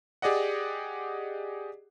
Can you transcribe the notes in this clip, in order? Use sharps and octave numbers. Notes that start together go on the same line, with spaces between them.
G4 G#4 D5 D#5 F#5